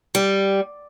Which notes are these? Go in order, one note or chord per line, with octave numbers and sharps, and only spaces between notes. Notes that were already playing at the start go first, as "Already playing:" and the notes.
G3